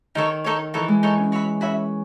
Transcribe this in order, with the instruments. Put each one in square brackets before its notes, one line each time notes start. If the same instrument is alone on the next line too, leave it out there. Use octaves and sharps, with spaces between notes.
[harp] D#3 [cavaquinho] D#4 A4 C#5
[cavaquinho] D#4 A4 C#5
[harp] E3 [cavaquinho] D#4 A4 C#5
[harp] G#3
[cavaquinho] D#4 A4 C#5
[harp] C#4
[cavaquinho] F#4 C#5 E5 B5
[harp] C#4 [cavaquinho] F#4 C#5 E5 B5